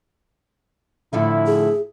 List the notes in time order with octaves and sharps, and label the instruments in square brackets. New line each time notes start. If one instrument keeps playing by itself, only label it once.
[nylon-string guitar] A2 D3 F3 [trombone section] E4
[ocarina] G#4